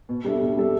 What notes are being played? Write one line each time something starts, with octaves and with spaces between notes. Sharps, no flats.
B2
G3 D4 A4 E5
B2
G3 D4 A4 E5